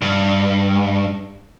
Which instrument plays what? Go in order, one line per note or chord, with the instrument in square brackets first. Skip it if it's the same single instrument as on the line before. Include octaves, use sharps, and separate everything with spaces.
[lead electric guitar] G2